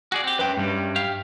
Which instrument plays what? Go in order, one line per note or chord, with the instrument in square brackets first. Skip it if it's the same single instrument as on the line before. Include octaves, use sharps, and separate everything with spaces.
[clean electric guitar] F#4 G#4 D5
C4 G4
[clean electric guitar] F#2 [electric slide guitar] B4 G5
[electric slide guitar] G2 G3
[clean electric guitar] G4 F5